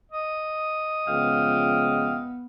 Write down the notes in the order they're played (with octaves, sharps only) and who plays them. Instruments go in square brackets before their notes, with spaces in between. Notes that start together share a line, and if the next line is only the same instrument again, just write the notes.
[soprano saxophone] D#5
[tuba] C#2 [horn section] F3 F5 G5 [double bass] B3